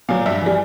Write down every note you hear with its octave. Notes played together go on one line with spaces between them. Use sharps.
A#2 F#3 F5
G2 E5
E3 G3